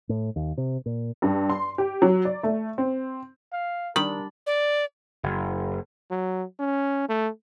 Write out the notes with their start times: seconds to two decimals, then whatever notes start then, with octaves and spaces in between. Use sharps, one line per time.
0.09 A2
0.36 D#2
0.58 C3
0.86 A#2
1.22 G2
1.50 C6
1.78 G4
2.02 F#3
2.25 D5
2.43 A3
2.78 C4
3.53 F5
3.96 D#3 G3 D4 A#4 B5
4.47 D5
5.23 F#1
6.11 F#3
6.60 C#4
7.09 A3